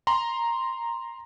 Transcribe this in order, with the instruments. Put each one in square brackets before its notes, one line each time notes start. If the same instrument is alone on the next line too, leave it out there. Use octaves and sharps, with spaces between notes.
[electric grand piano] A#5 C6